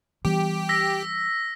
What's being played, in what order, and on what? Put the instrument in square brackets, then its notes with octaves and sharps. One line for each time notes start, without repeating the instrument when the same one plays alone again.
[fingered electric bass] E3 G3 B3 [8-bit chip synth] G4
[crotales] E6 A#6 B6